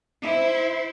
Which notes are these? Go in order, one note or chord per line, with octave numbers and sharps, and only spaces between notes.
E4 C5